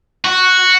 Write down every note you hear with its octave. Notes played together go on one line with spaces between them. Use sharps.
F#4